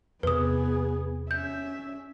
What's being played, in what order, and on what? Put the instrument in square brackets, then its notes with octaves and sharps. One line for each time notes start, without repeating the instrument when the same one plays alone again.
[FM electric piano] E2 C3 [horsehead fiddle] B3 G#4 [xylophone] B4 D#6
[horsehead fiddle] C#4 E5 [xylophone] G6